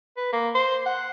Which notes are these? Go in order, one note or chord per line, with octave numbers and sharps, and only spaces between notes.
B4
A#3
C5
F#5